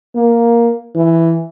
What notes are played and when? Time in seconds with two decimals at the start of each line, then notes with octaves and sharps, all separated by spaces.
0.16 A#3
0.95 E3